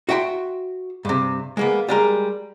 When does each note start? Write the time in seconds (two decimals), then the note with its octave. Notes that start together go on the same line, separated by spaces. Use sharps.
0.09 F#4 E5 G5 G#5 C6
1.05 G2 C3
1.57 G#3 A#3 B3
1.89 G3 G#3 A#4 C6